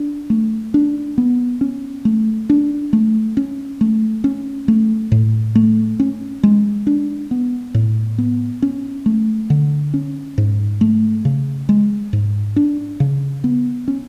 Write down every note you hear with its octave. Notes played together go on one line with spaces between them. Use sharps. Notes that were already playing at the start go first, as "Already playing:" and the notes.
Already playing: D4
A3
D4
B3
C#4
A3
D4
A3
C#4
A3
C#4
A3
A2
A3
C#4
G#3
D4
B3
A2
B3
C#4
A3
D3
C#4
G#2
A3
C#3
G#3
G#2
D4
C#3
B3
C#4